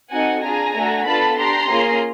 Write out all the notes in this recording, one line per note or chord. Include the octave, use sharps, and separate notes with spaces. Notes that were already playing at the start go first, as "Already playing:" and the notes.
C4 D#4 F#4 A4 F#5 G#5
D4 F4 G#4 G#5 A#5
A3 D4 F#4 A4
B3 D4 F4 A4 A5 B5
D4 G4 A#5 C6
A#3 C#4 F4 G#4